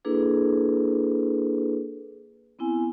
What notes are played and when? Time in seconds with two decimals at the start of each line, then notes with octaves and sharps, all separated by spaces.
0.05 A#3 D4 E4 G#4 A4 B4
2.59 B3 C4 E4 G#5